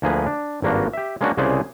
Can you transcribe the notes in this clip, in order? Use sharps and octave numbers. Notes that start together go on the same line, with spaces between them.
D2 F3 A#3 G#4 B4
D4
G#1 G2 A#3 D4 F#4
G4 E5
G#3 A#3 C#4 D4 F#4
C2 C#3 G#4 C5 D5 F#5